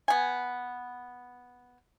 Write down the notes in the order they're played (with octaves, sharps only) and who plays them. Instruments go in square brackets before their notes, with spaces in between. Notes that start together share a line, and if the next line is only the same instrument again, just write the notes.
[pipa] B3 G#5